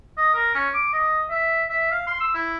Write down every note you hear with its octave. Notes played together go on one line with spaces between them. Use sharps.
D#5
A#4
C#4
D6
D#5
E5
E5
F5
C6
E6
E4